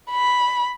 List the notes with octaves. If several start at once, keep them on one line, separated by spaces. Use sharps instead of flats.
B5